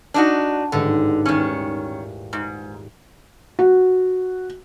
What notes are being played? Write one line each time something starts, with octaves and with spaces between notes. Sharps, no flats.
D4 D#4 F#4
A1 G#2 D3 D#3
D#1 D#3 C#4
G#2
F#4